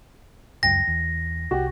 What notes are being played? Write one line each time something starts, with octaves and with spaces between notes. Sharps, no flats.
F1 C#2 F#2 G5 A#6
E2
C2 F#4 G4